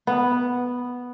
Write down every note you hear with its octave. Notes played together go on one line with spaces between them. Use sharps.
B3